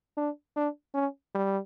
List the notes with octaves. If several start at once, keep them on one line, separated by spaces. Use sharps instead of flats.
D4
D4
C#4
G3